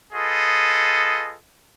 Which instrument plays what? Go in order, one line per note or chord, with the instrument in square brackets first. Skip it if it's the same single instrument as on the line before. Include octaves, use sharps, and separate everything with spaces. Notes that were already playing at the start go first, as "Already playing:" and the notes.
[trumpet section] F4 G#4 A4 B4 D#5